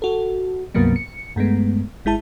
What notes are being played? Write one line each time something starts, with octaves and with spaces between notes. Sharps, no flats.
F#4 A4
C#2 G2 C3 F#3 A#3 B3
C#7
G2 G#3 A3 B3
G#1 G#3 E4 A5